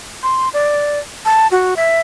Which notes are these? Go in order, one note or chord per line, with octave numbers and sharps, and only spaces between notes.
C6
D5
A5
F#4
E5